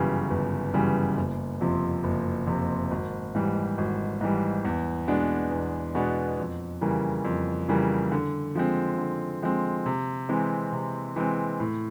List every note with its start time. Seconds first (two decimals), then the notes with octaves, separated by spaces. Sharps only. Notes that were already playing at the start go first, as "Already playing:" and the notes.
Already playing: G1 F#2 C#3 E3 G3
0.30 G1
0.74 F#2 C#3 E3 G3
1.17 F#1
1.61 F2 C3 F3
2.04 F#1
2.47 F2 C3 F3
2.91 G#1
3.35 G#2 E3 G3
3.78 G#1
4.21 G#2 E3 G3
4.65 E2
5.08 B2 G#3 B3 D4
5.51 E2
5.95 B2 G#3 B3 D4
6.38 F2
6.81 C#3 E3 G3 A#3
7.25 F2
7.69 C#3 E3 G3 A#3
8.12 D3
8.55 F3 G#3 C4
8.98 D3
9.42 F3 G#3 C4
9.86 C3
10.29 E3 G#3 C4
10.72 C3
11.16 E3 G#3 C4
11.60 A2